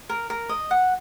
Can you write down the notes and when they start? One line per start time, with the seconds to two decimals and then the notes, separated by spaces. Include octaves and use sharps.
0.09 A#4
0.30 A#4
0.49 D#5
0.71 F#5